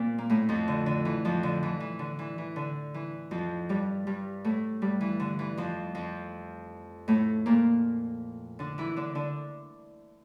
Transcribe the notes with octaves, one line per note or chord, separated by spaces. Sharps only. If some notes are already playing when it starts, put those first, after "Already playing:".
Already playing: A#2 C4
A#3
A2 A3
F2 F3
D3
D3
E3
F2 F3
D3
E3
E3
D3
E3
E3
D3
E3
F2 F3
G2 G3
G2 G3
A2 A3
G2 G3
E3
D3
E3
F2 F3
F2 F3
A2 A3
A#2 A#3
D3 D4
E3 E4
D3 D4
D3 D4